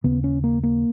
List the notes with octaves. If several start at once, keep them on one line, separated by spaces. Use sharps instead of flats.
D#2 C#3 B3
C#4
A#3
A#3